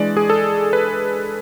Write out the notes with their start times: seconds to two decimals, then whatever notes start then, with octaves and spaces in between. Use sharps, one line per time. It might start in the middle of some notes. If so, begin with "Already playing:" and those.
Already playing: E3 G#3 D4 D5
0.17 G#4
0.30 A4
0.73 B4